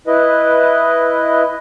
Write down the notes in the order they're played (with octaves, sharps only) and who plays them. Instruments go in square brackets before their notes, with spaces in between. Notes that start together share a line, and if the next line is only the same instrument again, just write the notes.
[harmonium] E4 B4 D#5